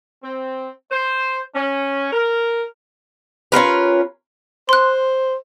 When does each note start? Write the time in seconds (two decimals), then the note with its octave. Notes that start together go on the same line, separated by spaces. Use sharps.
0.23 C4
0.92 C5
1.55 C#4
2.13 A#4
3.52 C#4 F4 A#4 B4
4.69 C5 C6 F#6